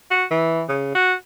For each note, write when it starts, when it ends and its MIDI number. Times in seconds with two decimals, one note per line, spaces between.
0.11 0.25 66
0.31 0.63 52
0.69 0.94 49
0.95 1.14 66